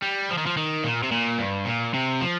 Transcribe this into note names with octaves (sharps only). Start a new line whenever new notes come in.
G3
F3
D#3
F3
D#3
A#2
C3
A#2
G2
A#2
C3
F3